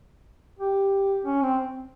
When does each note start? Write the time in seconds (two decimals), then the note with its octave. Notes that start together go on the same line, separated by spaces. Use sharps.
0.59 G4
1.24 C#4
1.42 C4